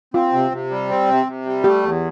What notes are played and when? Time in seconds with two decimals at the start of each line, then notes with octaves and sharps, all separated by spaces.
0.14 C4 F4
0.33 C3
0.51 C3
0.71 G3
0.89 C4
1.08 C3
1.27 C3
1.46 G3
1.64 A3 G4
1.83 E2